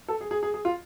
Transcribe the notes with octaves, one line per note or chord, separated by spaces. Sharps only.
A4
G#4
G#4
G#4
G#4
F4